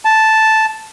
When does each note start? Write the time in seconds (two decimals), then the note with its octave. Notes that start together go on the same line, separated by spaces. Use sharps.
0.05 A5